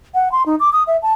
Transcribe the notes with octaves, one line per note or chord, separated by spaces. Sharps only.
F#5
C6
D#4
D6
D#6
E5
A5